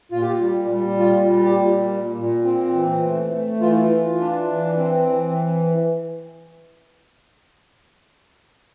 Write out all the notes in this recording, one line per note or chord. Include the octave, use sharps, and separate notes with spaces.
A#2 F4
G4
F4
G3
G3
A#2 F4
G3
G4
A#2
A#2
A#2
C4
E3
A3
A3
E3 F4
E4
F4
E3
D4
E3
C4
E3